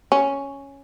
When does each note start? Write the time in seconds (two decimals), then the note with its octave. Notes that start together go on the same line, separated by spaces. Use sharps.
0.12 C#4